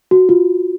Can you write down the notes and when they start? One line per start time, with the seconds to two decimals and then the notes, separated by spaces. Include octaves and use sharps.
0.11 F#4
0.29 F4